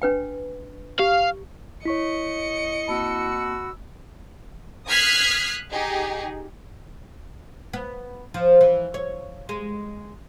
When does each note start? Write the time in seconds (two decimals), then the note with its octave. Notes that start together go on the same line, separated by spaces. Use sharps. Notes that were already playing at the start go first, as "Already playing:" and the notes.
0.02 D4 B4 G5
0.99 G4 F5
1.85 E4 C#5 D#5 C#6 B6 C#7
2.88 A#3 C4 F#4 A5 B5 E6
4.89 D#6 F6 F#6 G#6 B6 C7
5.71 D#4 G4 G#4
7.73 B3
8.34 F3
8.61 E3
8.94 C#5
9.49 G#3